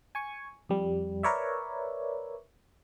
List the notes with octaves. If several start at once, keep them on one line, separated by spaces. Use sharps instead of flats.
G#5 C#6
F2 G3
A#4 B4 C#5 D5 E5